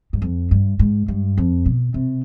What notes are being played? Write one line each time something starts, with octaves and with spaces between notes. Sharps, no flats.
G2
F2
G2
G#2
G2
F2
B2
C3